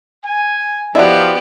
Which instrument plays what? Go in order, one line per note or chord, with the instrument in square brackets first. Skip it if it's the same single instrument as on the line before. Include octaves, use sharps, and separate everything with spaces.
[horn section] G#5
[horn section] F3 [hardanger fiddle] B3 G4 [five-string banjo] E4 F#4 [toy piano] D5 D#5